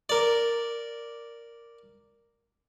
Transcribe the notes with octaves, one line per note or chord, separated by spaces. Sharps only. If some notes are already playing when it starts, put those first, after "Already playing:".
A#4 D5